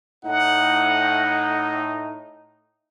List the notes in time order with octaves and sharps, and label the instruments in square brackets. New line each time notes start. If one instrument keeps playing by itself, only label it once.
[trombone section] A2 D#4 [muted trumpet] F#5